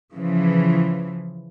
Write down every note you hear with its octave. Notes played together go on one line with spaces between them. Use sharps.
C#3 E3 F3